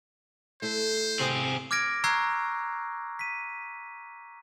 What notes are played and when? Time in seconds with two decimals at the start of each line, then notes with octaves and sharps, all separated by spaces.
0.62 A3 E4 A4 C5
1.20 C3 C4 G#4
1.71 D6 F6 G#6 A#6 D7
2.04 A#5 C#6 E6 F#6 G#6 C7
3.19 B6 D#7